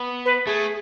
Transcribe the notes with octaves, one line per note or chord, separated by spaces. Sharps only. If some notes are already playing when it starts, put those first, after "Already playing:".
Already playing: B3
B4
A3 G#4